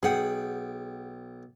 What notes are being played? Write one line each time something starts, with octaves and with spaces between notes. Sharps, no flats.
B1 G#4 F#5 G5